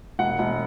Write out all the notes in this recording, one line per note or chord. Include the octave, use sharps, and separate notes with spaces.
E1 F#5
E1